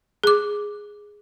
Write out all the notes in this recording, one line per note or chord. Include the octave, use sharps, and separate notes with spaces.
G#4 D6